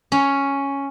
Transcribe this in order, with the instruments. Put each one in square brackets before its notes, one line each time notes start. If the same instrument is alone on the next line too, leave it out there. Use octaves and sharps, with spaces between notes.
[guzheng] C#4